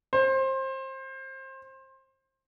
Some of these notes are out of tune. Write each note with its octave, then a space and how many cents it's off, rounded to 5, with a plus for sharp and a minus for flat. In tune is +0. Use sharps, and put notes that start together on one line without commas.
C5 +25